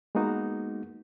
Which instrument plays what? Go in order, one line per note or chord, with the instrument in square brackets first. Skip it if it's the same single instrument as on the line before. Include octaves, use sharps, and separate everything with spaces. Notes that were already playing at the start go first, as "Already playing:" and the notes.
[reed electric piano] G#3 A#3 B3 D#4 F#4